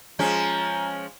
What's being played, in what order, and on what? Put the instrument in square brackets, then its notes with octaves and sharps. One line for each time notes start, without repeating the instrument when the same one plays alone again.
[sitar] F3 G#3 C#4 [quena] A#5